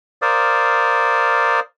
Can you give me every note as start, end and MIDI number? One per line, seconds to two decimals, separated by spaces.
0.22 1.60 70
0.22 1.60 72
0.22 1.60 74
0.22 1.60 77
0.22 1.60 87